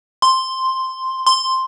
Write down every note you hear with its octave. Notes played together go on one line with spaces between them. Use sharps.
C6
C6